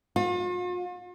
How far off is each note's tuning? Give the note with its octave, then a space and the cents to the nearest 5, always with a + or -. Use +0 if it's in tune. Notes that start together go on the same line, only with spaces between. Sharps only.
F4 +45